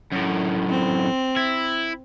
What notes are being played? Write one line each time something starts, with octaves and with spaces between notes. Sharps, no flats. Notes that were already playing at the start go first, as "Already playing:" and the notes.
F#2 A2
C4
E4